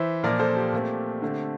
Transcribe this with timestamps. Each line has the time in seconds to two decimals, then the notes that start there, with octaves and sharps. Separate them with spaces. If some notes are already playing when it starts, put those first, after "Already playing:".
Already playing: E3 C5 E5
0.23 A#2 F3 A#3 A#4 D5
0.39 A4 C5
0.57 G4
0.73 A#2 A3 C4
1.22 D3 A3 C4